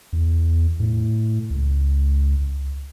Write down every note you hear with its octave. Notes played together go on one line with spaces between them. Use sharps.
E2
A2
C#2